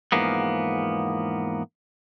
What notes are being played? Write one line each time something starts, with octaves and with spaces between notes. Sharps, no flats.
E2 G#2 F3 A#3 B3